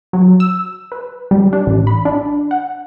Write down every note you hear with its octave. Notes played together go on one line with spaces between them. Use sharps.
F#3
E6
B4
G3
D4
A1
B5
D4
F#5